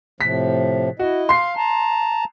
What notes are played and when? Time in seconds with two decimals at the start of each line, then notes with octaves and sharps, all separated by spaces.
0.21 A2 C3 F3 B6
0.99 E4 F#4 D#5
1.29 F5 C6 C7
1.57 A5 A#5